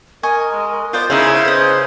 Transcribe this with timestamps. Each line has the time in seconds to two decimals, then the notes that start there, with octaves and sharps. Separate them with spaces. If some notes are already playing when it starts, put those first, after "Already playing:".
0.23 A#4 D#5 G#5 C#6
0.52 G#3
0.93 B3 F4 C5 D5 G6
1.10 C#3 D#4 E4 C5 F5
1.45 B4 C5 D#5